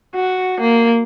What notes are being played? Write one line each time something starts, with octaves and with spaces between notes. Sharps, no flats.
F#4
A#3